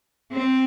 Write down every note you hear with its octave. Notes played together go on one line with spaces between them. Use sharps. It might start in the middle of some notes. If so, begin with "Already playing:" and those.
C4